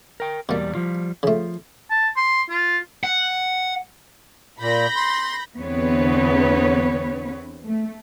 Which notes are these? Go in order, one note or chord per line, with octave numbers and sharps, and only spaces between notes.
A#4 G5
E2 B2 G3 A#3 D5
F3 G3 F4
C#3 F3 A3 F4
A5
C6
F4
F#5
A#2 B5 G6 A#6
C6
E2 D3 B3 C4 B4 C#5
A3